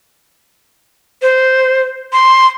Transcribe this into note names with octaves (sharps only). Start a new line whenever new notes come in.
C5
C6